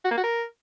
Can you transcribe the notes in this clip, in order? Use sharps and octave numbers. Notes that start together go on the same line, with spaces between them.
F#4
A#3
F#4
A#4